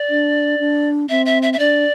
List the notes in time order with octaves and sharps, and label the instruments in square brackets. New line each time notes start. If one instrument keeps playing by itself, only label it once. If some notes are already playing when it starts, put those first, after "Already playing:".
Already playing: [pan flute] D5
[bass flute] D4
D4
[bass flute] C4 [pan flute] E5
[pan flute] E5
E5
E5
[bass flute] D4 [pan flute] D5